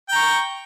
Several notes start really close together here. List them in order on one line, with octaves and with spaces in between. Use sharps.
G5 A#5 C#6